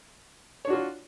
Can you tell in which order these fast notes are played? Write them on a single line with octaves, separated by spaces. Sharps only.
C#5 D4 F#4 F4